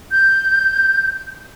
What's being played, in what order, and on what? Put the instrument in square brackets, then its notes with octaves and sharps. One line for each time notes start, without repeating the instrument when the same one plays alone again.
[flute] G6